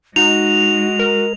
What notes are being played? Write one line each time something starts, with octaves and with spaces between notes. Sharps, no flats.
G#3 D#4 F#4 F7
A#4